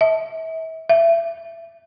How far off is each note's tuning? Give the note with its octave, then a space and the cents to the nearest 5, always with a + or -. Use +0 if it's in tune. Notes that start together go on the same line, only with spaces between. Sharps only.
E5 -35
E5 +25